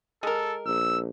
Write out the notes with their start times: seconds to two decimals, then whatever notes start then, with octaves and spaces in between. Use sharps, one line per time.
0.23 G#3 A4 A#4
0.66 A#1 E6